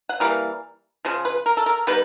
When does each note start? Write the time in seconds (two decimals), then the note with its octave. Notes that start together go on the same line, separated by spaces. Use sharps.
0.09 F#5
0.20 E3 G3 A#3 F5
1.05 C#3 F3
1.25 B4
1.46 A#4
1.57 A4
1.66 A#4
1.87 D#3 G3 B3 B4